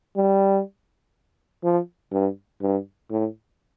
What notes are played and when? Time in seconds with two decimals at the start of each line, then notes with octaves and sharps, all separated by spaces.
0.16 G3
1.63 F3
2.12 G2
2.61 G2
3.10 A2